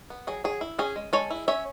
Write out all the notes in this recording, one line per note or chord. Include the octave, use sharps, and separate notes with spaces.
B3
F#3 G#4
F#3 G#4
E4
C#4 G#4
G#3
G#3 A4 C#5
E4
C#4 C#5 E5